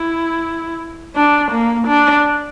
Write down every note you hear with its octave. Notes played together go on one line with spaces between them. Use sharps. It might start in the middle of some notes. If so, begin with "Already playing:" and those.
Already playing: E4
D4
A#3
D4